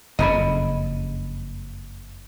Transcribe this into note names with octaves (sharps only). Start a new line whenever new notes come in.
F#1 F2 C#3 D#5 A#5 B5